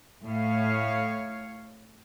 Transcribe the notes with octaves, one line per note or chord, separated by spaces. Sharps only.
A2 C#5 F5